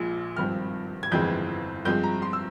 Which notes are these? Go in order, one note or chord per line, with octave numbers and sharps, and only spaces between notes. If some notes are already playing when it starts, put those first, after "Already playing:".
Already playing: A#1 A#2 F3 G#3
G#1 G2 F3 C4 F6
G#6
G1 F2 E3 G#3 C4 G6
G2 F3 G#3 C4 G6
A#5
C6
E6